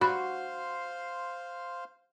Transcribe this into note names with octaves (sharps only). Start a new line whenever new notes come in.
F#4 C5 F5 B5 C6